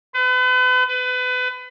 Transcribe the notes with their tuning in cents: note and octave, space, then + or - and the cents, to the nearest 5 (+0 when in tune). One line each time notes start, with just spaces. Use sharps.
B4 +40
B4 +30